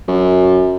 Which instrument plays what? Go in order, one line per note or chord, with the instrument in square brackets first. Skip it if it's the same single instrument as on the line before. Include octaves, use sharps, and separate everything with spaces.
[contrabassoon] F#2